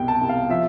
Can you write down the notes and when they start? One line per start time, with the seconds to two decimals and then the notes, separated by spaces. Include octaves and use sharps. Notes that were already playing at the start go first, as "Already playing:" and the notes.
Already playing: C2 B2 G5
0.08 A5
0.21 C2
0.29 F5
0.49 F3 E5